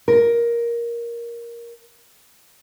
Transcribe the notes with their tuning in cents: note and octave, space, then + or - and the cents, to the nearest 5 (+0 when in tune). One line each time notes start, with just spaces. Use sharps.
A#4 +10